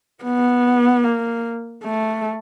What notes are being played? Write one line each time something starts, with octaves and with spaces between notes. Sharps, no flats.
B3
A#3
A3